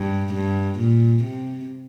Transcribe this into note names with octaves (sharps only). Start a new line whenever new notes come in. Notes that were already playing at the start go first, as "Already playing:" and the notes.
Already playing: G2
G2
A#2
C3